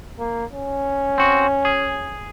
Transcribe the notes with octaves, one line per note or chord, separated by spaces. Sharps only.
A#3
C#4
C4 F#4
G#4